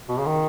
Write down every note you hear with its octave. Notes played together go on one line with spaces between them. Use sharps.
B2
C#3
D#3